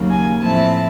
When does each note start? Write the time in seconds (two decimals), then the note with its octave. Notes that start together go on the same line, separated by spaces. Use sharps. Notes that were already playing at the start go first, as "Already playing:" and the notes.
Already playing: D#2 C#3 F#3 A#3
0.10 G#5
0.40 A2 F3 A3 C4 E4 A5